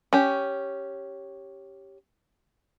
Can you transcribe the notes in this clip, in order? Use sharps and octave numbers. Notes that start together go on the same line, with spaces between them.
C#4 G4